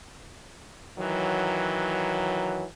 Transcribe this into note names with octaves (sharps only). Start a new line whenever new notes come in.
D#3 E3 F#3